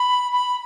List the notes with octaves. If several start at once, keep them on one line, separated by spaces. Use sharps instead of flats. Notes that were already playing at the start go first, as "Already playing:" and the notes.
Already playing: B5
B5